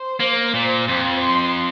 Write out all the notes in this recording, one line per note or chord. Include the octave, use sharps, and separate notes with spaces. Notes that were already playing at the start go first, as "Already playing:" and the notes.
Already playing: C5
A#3
A#2 C5
F2
C6